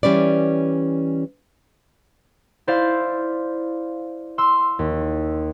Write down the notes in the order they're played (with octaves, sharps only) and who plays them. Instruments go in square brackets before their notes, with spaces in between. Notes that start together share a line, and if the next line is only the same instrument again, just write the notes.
[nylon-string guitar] E3 G3 C#4 B4 D5
[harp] E4 C5 D5 F5
C6 E6
D#2